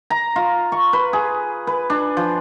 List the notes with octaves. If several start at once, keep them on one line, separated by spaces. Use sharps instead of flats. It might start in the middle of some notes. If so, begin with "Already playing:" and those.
A#5
F4
C#6
B4
G#4
B4
D4
F3